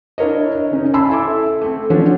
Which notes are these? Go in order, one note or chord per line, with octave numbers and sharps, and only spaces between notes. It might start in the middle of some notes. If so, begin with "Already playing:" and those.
D4 E4 A#4 C#5 D#5
C#3 C#4 D#4
G#5 A5 B5 C6 E6
E4 A4 E5 D6
A3 C4
F3 C#4 D4 F#4